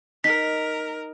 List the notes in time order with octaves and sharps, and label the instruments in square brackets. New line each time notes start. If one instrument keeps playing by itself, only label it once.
[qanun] D#4 [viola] A#4 [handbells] B6